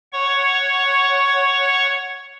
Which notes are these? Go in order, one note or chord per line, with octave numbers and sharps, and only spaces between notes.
C#5 F#5 C#6